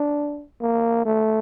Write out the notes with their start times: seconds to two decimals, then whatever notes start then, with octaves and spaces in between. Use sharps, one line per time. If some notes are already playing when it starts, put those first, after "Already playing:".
Already playing: D4
0.61 A#3
1.05 A3